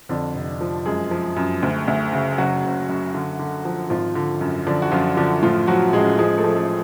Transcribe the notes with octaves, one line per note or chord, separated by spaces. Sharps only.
F2 D3 D4
F1
F3
F#2 G#3 G#4
F3
F#2
D2
D2
C#3
F#1 F#3 F#4
F#1
F#2
D3
D3
F3
G#1 F3 F4
D3
F#2
D3 F3 D4
F#4
F#2 F3 F4
D3 F3 D4
A2 F3 F4
F3 F#3 F#4
A1 G#3 G#4
F3 G#3 G#4
A3 A4
F3
A3 A4